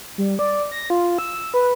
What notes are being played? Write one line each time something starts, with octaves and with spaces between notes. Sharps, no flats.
G3
D5
A#6
F4
E6
B4